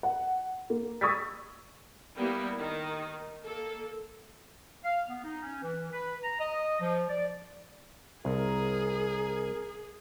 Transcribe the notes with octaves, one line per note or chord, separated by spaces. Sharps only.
F#5
A#3
C#6 D#6 E6 G#6 A6 B6
G3 A#3 B3 E4
D#3
A#3 A4
F5
B3
D#4
C#4
E3
B4
A#5
D#5
F3
D5
C2 G#4 A#4